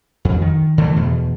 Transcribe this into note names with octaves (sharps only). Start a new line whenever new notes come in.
F2
D#3
D3 E3 F3 A3
E2 B2